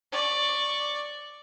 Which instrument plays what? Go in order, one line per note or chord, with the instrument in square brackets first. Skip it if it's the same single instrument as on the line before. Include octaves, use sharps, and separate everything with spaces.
[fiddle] D5 C#6